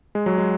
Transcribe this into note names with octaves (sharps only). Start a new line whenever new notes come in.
G#3
F#3
G#3